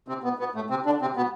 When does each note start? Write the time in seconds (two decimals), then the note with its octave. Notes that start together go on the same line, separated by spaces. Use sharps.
0.08 C3 C4
0.23 B2 B3
0.39 B2 B3
0.54 A2 A3
0.70 C3 C4
0.86 D3 D4
1.01 C3 C4
1.17 B2 B3